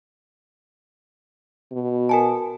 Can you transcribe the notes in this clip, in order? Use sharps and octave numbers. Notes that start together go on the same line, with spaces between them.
B2
A#4 G#5 A5